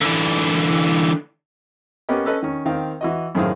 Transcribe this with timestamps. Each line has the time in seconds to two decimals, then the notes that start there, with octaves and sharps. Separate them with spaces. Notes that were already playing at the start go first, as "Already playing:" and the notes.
0.01 D3 E3
2.09 A#3 B3 C#4 G4 D#5
2.26 C#4 A4 B4 D#5
2.43 D#3 C#4
2.66 D#3 C4 F5
3.01 E3 F#4 D#5
3.35 F#2 A2 D#3 G#4 C5 F5